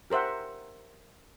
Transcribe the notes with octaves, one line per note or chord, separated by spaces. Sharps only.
G4 A#4 C5 E5 F#5